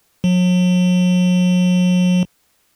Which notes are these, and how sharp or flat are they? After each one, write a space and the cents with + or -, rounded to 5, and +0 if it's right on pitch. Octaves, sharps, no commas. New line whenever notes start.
F#3 -40